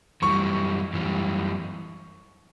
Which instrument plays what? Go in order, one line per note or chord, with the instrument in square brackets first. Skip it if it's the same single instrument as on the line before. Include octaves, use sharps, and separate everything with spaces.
[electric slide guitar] F#2 E3 G3 [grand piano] C#6
[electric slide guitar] F#2 E3 G3